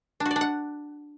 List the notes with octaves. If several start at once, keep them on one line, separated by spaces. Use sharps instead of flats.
D4
F#4
D5
D4
F#5